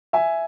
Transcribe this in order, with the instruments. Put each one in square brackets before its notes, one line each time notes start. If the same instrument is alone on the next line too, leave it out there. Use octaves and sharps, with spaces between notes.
[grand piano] E5 G#5